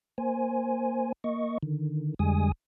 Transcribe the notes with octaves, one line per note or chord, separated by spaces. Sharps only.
A#3 C5 G#5
A#3 D#5 C#6
D3 D#3
F2 D3 G3 G#3 G#5 D#6